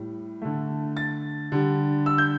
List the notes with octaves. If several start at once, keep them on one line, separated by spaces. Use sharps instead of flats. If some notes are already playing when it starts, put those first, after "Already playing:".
Already playing: A2 G3
D3 A3
A6
D3 G3
E6
G6